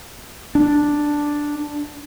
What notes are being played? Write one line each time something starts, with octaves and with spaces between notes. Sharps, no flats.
D4